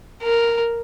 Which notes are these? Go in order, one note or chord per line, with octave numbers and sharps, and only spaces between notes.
A#4